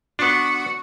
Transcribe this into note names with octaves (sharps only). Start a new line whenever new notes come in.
B3 D4 F#4